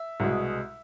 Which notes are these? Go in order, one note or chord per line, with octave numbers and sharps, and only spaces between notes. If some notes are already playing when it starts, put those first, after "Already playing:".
Already playing: E5
C2 B2 G#3